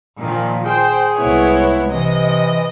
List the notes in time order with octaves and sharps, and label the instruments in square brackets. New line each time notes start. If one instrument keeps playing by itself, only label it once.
[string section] A#2 D#3 F3
[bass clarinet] G#4 [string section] C5 [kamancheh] G5
[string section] C2 G#3 C#5 [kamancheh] B3 E4
[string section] C3 [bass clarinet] E3 [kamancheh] D#5